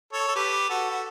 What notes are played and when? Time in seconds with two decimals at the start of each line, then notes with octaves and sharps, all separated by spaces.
0.13 A4 C#5
0.28 A4
0.35 G4 B4
0.69 F#4 A4
0.90 F#4